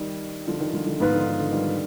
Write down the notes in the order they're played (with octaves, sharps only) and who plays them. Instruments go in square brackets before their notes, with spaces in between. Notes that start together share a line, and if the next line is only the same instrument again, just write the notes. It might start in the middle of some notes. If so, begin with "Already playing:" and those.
Already playing: [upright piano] D#3 G3
D3 F3
D#3
D3 F3
D3 F3
[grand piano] G#2 F3 B3 F4 B4 [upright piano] D#3
[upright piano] D3
D#3
D3
D#3 G3